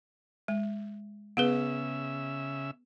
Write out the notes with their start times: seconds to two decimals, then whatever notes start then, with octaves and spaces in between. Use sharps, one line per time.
0.48 G#3
1.37 C#3 B3 G#4 B4 E5